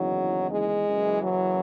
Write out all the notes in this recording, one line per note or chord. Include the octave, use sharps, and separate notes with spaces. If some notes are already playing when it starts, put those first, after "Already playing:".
Already playing: F#1 E2 D#3 F#3
G#3
F#1 F#2 E3
F#3